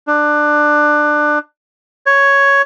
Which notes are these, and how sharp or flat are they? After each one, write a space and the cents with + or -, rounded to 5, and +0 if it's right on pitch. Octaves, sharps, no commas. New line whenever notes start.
D4 +20
C#5 +5